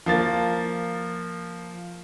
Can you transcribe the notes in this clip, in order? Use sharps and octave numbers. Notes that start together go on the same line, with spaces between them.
F3 A#3 A6